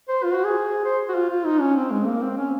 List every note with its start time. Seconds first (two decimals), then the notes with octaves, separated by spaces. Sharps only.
0.08 C5
0.24 F4
0.34 F#4
0.44 G#4
0.85 C5
1.09 F#4
1.15 F4
1.30 F4
1.45 D#4
1.60 C#4
1.76 C4
1.91 G#3
2.06 A#3
2.22 C4
2.37 C#4